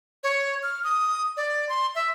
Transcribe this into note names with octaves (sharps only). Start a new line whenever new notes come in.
C#5
F6
D#6
D5
C6
E5